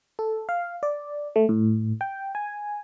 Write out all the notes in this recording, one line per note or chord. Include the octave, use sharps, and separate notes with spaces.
A4
F5
D5
A3
A2
G5
G#5